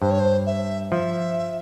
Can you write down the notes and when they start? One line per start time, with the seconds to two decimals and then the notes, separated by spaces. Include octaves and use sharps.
0.01 G2 C5
0.11 C#5
0.20 C5
0.46 E5
0.91 F3 E5